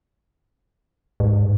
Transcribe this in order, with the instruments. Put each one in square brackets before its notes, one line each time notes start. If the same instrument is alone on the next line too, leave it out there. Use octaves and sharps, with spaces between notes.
[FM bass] G#2